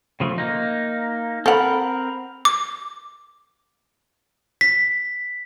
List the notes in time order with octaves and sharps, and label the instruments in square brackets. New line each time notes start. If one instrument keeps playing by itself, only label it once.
[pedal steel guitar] C#3 F3 A3
A#3 D#4
[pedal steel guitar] C4 A#4 B5 [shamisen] A4 F#5
[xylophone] D6
[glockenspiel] B6